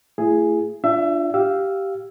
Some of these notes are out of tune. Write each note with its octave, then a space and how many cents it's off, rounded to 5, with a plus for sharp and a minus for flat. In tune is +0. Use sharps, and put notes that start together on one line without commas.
A3 +25 E4 +35 G#4 +0
D4 +0 F4 -20 E5 +25
G4 -10 F5 +0 E6 +0